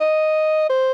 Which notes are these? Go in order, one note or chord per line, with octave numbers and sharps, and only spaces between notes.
D#5
C5